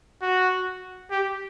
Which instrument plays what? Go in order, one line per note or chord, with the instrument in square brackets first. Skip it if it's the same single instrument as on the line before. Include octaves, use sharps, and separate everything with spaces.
[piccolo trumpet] F#4
G4